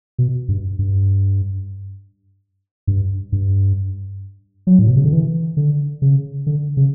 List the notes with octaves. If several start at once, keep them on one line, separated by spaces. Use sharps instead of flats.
B2
G2
G2
G2
G2
F#3
A2
B2
C#3
D3
E3
D3
C#3
D3
C#3